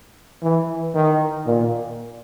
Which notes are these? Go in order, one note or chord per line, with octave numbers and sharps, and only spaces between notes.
E3
D#3
A#2